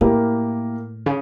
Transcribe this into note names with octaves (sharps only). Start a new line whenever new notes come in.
A2 A#3 E4 G4 A#4
C#3